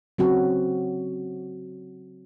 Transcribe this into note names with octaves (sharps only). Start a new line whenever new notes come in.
C#3 F#3 C4 F#4